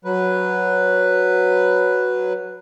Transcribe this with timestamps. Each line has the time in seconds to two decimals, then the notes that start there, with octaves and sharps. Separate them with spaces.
0.05 F#3 B4